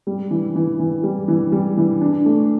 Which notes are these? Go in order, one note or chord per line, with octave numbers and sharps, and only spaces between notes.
G3
E3
E3
E3
G3
E3
G3
E3
D4
A3